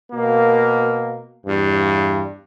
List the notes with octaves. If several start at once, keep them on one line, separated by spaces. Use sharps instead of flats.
B2 A#3
E2 G2